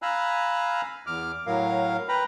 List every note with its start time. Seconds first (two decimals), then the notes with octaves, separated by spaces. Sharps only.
0.02 F5 G#5 A#5 B5 E6 F#6
1.06 E2 D6 F6
1.46 A2 F#3 A#4 F5
2.09 B4 G5 A#5 B5